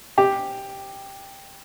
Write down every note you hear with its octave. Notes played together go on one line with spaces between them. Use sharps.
G4